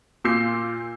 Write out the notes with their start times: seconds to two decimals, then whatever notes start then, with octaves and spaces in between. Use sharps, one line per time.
0.24 A#2 F4 E6 G6 C7